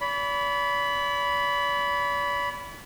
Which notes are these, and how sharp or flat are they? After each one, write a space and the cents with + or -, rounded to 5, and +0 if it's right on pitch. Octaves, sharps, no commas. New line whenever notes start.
D5 -45 B5 +0